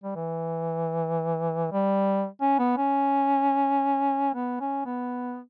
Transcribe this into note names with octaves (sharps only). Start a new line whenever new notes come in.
G3
E3
G3
C#4
B3
C#4
B3
C#4
B3